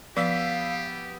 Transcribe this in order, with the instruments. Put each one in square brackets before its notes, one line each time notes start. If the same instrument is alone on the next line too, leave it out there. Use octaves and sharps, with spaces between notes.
[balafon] F3 [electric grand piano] B3 E6 B6 [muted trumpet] G4 [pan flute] F5